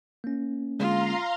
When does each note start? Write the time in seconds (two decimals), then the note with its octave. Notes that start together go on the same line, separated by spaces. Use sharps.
0.24 A#3 C#4
0.79 D3 G#3 F4 F5 A#5 C6